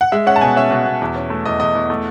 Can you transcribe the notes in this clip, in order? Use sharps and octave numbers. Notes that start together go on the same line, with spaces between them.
F#5
G#3 E5
C#4 F#5
A5
B2 G#5
C#4 E5
B2
B2
E2
C#4
A3
E2 D#5
E2 D#5
E2
A3